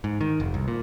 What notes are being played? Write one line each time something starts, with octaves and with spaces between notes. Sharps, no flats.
G#2
D#3
F1
C2
A#2